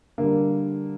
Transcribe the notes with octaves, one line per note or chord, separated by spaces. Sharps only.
D3 G3 A#3